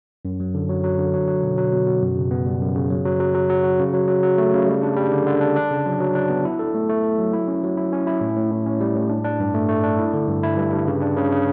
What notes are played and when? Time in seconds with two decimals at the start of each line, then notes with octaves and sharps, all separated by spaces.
0.25 F#2
0.40 F#3
0.54 D3
0.69 F#3
0.84 F#3
0.98 D3
1.14 F#3
1.28 F#3
1.43 B2
1.58 F#3
1.73 B2
1.87 B2
2.01 F#2
2.16 C#3
2.31 B3
2.46 G3
2.61 F#2
2.76 C#3
2.90 F#3
3.05 F#3
3.20 F#3
3.34 F#3
3.50 F#3
3.64 F#4
3.79 C#3
3.93 F#3
4.08 F#3
4.23 F#3
4.38 A3
4.53 C#3
4.67 G3
4.83 D4
4.97 G3
5.12 D3
5.26 D3
5.41 D4
5.56 D4
5.71 C#3
5.86 F#3
6.00 F#3
6.15 D4
6.30 B3
6.45 E4
6.59 A4
6.74 A3
6.89 A3
7.03 A4
7.19 F#3
7.33 E4
7.48 C#4
7.63 F#3
7.77 E4
7.93 C#4
8.07 E4
8.21 A2
8.36 A2
8.51 A2
8.66 C#4
8.80 G3
8.96 A2
9.09 D4
9.25 D4
9.40 G2
9.54 A3
9.69 A3
9.84 D4
9.99 E4
10.14 D3
10.28 G2
10.43 E4
10.58 G2
10.72 G2
10.87 C#3
11.02 D4
11.17 C#3
11.32 C#3